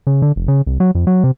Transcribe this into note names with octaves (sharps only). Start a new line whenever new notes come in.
C#3
D3
F1
C#3
C2
F#3
F2
F#3
C3